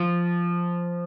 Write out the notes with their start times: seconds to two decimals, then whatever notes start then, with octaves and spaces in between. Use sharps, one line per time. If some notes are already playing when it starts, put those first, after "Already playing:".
Already playing: F3